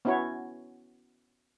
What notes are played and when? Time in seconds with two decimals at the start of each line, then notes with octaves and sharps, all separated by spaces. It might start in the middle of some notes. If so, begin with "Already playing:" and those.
0.05 B3 C#4 E4 F#4 C#5